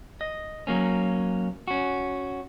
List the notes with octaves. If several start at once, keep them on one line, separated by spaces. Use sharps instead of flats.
D#5
F#3 A#3 C#4
C#4 F#4